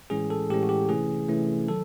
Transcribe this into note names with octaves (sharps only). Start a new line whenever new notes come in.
A2 E3 G#3 C#4 G#4
A4
A2 E3 G#3 C#4 G4
F#4
G4
C3 E3 A3 C#4 G#4
C3 E3 A3 C#4
D#3 F#3 A4